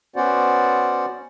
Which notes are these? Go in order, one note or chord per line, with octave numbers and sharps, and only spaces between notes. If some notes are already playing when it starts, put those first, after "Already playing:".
B3 C#4 F#4 C5 D5 F#5